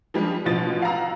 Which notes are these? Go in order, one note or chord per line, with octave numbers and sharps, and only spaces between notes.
F3 G3 G#3 D4
A1 B2 F3 A6
F5 F#5 A#5 E6